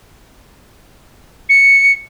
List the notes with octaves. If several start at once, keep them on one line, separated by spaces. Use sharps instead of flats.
C#7